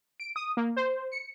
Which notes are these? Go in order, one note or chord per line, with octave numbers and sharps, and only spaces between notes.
D7
D#6
A#3
C5
C#7